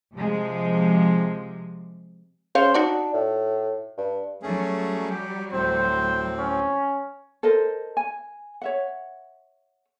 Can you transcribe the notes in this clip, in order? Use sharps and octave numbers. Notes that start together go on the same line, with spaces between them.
C3 F3 G#3
C#3 C5 C#5 F5
D4 D#4 F#4 D5
A2
G2
F#3 G3 A3 C#4 G#4
G4
D2 A2 C4 C5
C#4
A4 A#4 C5 D#5
G#5
C#5 E5 F#5